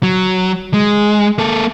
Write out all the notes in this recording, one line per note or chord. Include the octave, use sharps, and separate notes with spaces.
F#3
G#3
A#3 A4